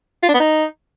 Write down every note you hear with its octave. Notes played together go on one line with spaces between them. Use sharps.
F4
D4
B3
D#4